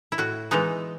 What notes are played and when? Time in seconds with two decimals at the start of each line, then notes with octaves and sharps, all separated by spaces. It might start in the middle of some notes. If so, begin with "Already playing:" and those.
0.12 E4
0.18 A2 F#4
0.51 E3 G#3 B3 D#4